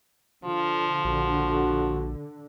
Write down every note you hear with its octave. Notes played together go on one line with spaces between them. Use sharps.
D3 F3 F4
A#1 F#4